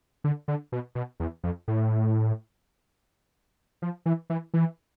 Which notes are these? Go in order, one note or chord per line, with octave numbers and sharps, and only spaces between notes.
D3
D3
B2
B2
E2
F2
A2
F3
E3
E3
E3